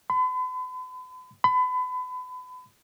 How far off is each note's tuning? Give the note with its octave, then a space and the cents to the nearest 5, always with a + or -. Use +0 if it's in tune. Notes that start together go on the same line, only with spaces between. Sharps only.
B5 +40
B5 +30